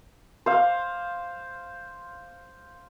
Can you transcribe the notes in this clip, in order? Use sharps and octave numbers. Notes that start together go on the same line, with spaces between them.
C5 F5